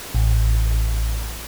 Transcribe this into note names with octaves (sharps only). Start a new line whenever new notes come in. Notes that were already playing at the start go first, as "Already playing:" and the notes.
A1